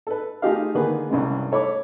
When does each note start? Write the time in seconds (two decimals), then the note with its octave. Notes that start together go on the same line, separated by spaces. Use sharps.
0.07 A4 B4
0.42 A3 D#4 F4 G4 G#4 F5
0.75 D2 D#3 A#3 G#4 B4
1.09 C2 G2 C#3 G#3
1.52 A4 C#5 B5 D6